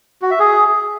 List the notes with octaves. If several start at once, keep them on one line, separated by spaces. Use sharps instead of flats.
F#4
E5
G#4